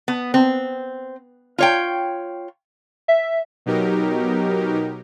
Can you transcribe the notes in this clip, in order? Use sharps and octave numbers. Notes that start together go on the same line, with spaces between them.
B3
C4
F4 C#5 G5
E5
B2 F#3 D#4 G4 A#4